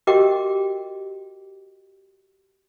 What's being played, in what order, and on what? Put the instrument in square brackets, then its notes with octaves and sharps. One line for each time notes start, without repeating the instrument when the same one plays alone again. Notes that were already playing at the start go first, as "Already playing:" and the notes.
[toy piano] F#4 G4 A#4 D#5 G5 D6